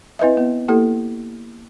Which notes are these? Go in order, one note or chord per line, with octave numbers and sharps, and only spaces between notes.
C4 E4 B4 D#5 E5
B3
A#3 E4 G4 A4